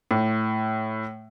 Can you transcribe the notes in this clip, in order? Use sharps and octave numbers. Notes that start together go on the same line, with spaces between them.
A2